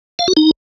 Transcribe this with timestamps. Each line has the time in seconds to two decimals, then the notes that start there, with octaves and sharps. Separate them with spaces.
0.19 F5
0.28 F#4
0.37 D#4